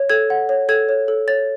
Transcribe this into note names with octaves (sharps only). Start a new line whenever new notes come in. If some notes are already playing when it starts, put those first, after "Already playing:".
Already playing: C#5
A4 G#6
F#5
C#5
A4 G#6
C#5
A4
C#5 A6